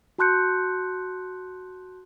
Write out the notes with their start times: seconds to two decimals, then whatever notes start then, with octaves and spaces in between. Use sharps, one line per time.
0.19 F#4 A5 C6 F#6 G6 C#7